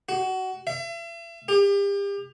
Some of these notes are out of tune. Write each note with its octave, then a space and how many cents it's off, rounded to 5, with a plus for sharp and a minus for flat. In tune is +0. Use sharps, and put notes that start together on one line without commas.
F#4 +20
E5 +40
G4 +35